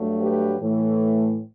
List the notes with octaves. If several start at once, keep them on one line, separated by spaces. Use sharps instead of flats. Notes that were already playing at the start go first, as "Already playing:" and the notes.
Already playing: G2 F#3 A3
G4 B4
A2 E3 A3